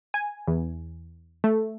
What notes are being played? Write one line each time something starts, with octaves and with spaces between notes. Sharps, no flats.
G#5
E2
A3